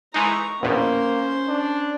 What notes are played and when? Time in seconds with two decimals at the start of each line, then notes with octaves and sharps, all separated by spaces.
0.14 E3 G#3 D#4 A#5 C#6
0.62 A#1 E2 B2 A#3 C#4 C5
1.49 D4